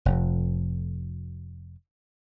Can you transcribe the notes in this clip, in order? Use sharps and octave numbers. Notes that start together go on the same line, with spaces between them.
F1 F2